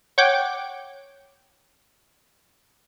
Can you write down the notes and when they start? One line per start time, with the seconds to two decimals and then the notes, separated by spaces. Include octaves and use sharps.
0.18 C#5 F#5 G5 D6